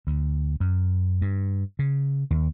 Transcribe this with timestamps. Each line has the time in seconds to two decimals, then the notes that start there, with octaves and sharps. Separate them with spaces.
0.07 D2
0.60 F#2
1.21 G2
1.79 C#3
2.30 D#2